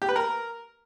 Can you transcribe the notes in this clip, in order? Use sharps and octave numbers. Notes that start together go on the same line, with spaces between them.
G4
B4
A#4